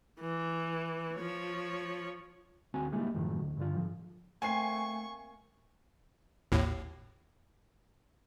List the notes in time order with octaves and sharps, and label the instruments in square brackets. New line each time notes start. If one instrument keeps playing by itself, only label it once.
[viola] E3
F3 C#5
[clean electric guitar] D2 C4 F#4 G#5
G3 G#3 A#3 D#4 E4 G4
F#2 A2 D#3 F3 F#3
D2
G2 D3 F4
G#2 F3
[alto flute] A3 [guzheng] A#3 C4 [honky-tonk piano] G#5 C7 [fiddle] C#6
[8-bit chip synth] G#1 D#2 A2